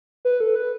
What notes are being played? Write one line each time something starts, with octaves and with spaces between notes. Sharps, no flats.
B4
A4
B4